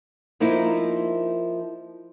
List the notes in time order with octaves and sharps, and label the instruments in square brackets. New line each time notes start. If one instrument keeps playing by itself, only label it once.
[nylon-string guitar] F3 A#3 D#4 E4